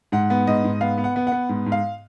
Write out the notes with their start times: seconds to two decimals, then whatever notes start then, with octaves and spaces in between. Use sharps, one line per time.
0.12 G#2 F#5
0.30 B3
0.47 G#2 D#5
0.64 G#2
0.81 B3 F5
0.98 B3
1.04 F#5
1.16 B3
1.27 B3 F#5
1.49 G#2
1.66 G#2
1.72 F5